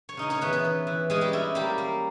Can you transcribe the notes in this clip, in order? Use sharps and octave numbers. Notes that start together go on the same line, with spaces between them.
C#5
C#3 D#4 D#5
C#4 C#5
E3 B3 B4
B3 B4
E3
E3
G#3 C#4 G#4
G3 G4
C#4 E4
G3 A#3 G4
A#3